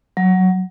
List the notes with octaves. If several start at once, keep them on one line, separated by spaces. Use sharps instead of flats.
F#3